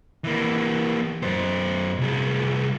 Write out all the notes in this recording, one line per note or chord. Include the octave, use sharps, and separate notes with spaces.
E3 A#3
F#2 C5
C2 G#4